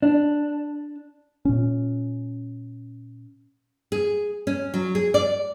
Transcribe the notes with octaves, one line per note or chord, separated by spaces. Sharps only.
D4
A#2 C#4
G#4
C#4
F#3
G#4
D5